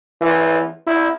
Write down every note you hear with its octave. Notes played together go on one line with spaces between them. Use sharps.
E3
E4